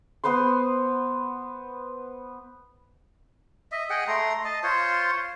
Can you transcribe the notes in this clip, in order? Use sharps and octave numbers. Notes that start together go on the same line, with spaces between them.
B3 B4 C5 C6
D#5 E5
G#4 D#5 F#5 G5
A3 A#5 C6
D#5 A5
F4 C5 C#5 C6